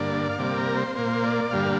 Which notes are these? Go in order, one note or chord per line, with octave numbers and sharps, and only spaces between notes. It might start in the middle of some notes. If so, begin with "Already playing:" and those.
Already playing: G2 D3 A#3 D5
F5
C3 G3 A#3 D5
A#4
C5
A#2 A#3 C5
D5
G2 D3 G3 A#3 F5